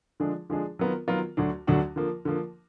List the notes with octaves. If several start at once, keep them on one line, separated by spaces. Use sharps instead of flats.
D3 F3 G#3 D4 G#4
D3 F3 G#3 D4 G#4
D#3 F#3 B3 F4 A#4
D#3 F#3 B3 F4 A#4
D2 D3 F#3 D4 F#4
D2 D3 F#3 D4 F#4
D3 F3 A#3
D3 F3 A#3